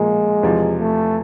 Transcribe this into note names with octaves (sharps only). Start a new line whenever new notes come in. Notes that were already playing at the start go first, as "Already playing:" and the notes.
Already playing: A#2 F3 G#3 A#3
E2 C3 F3
A3